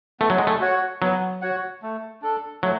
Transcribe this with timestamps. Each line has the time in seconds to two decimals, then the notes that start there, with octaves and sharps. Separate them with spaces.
0.20 A3 B3
0.30 F#3
0.38 G#3
0.47 A3
0.60 F#4 C#5 F#5
1.02 F#3 B3
1.41 F#4 C#5 F#5
1.82 A3
2.22 D4 A4
2.63 F#3 A3